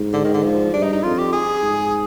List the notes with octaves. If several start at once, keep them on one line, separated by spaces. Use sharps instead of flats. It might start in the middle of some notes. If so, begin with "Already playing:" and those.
Already playing: G#2
D3
D#3
D3
F3
G2 D4
D#4
D#4
F2 F4
G4
G#4
G#2